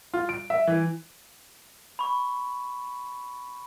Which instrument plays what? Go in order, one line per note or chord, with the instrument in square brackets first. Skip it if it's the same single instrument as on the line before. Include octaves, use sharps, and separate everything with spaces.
[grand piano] F4
D7
E5
E3
[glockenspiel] B5 C#6